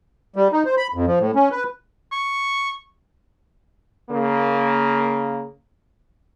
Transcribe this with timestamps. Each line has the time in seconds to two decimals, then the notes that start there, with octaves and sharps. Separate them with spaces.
0.36 G3
0.52 D#4
0.65 C5
0.77 B5
0.94 F2
1.07 F3
1.19 A2
1.35 C#4
1.51 B4
2.12 C#6
4.10 C#3 A#3